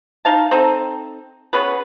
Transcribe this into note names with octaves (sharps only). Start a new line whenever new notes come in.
D#4 F5 A5
C4 D#4 A4
B3 C#4 G#4 B4